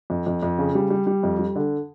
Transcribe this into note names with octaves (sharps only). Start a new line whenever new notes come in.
F2
F2
F2
C#3
G3
G3
G3
F2
G3
D3